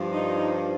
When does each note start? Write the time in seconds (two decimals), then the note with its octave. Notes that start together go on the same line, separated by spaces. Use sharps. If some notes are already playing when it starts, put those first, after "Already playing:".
Already playing: G2 F3
0.12 D#4